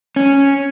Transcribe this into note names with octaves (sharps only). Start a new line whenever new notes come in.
C#4